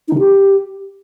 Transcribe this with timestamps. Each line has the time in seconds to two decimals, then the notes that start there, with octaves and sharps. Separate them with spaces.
0.08 D#4
0.13 D3
0.18 G4